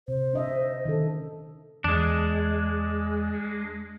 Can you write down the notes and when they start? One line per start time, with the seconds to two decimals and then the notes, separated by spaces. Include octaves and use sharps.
0.08 C3 C5
0.34 D4 D#5 E5
0.85 D#3 C#4 A4
1.84 E2 G#3 D4